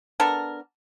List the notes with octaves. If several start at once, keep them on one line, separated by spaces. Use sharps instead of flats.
B3 D4 A4 A#4